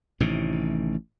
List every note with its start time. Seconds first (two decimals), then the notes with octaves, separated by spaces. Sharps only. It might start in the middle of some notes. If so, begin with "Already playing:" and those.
0.20 A1 A2 C3 D#3